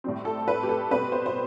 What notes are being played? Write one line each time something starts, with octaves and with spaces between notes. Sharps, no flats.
A2 G3 C4
A4
B4
G4
A4
B2 G3 C4 B4
C5
C5